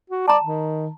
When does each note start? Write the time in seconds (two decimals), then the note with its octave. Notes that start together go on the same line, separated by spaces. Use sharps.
0.10 F#4
0.28 D5 A5 A#5
0.43 D#3